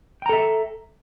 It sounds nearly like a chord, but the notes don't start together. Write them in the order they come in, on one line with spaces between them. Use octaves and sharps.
G5 A#5 A4 E5